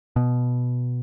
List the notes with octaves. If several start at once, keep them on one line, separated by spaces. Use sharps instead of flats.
B2